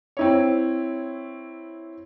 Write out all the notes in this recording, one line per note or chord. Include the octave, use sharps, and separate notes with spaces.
C4 E4 C#5